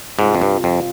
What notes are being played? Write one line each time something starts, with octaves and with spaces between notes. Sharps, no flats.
G#2 C3 G3 C4 F4
F2
G2
F2